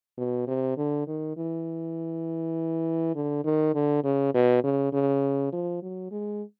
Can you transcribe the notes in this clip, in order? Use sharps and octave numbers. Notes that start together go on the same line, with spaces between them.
B2
C3
D3
D#3
E3
D3
D#3
D3
C#3
B2
C#3
C#3
F3
F#3
G#3